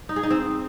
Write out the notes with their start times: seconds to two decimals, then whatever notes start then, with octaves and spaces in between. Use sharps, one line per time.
0.09 D#4
0.16 G#4
0.23 D#4
0.30 C4